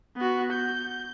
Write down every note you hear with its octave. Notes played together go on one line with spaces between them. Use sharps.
B3 F#4
G6